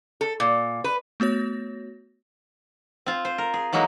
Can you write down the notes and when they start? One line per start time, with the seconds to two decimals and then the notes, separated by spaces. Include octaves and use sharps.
0.21 A4
0.40 A#2
0.84 B4
1.20 A3 B3 F#4 C#5 A#6
3.06 C4 F4
3.25 C5
3.38 A#4
3.54 G#4
3.73 E3 F#3 G#3 A#3 D#4